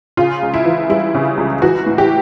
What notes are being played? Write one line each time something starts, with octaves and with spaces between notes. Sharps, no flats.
C#3 F4
C#2
E4
E3
G3 E4
C#3
C#2
E3 F#4
A2
G4